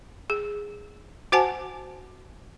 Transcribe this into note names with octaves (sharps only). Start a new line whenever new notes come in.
G#4
F#4 C5 F#5 G#5 A5